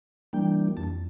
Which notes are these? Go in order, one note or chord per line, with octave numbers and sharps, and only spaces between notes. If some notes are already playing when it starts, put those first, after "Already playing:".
E3 G3 A#3 D4 G5
F2 A5